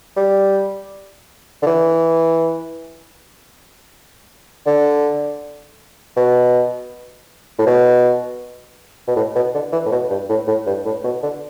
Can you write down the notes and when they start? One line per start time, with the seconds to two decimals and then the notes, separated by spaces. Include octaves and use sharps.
0.17 G3
1.62 D3
1.67 E3
4.67 D3
6.16 B2
7.59 A2
7.66 B2
9.08 B2
9.16 A2
9.36 B2
9.54 D3
9.72 E3
9.86 A2
9.92 B2
10.10 G2
10.29 A2
10.48 A2
10.67 G2
10.85 A2
11.04 B2
11.23 D3